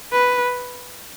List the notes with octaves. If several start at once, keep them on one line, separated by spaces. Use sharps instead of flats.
B4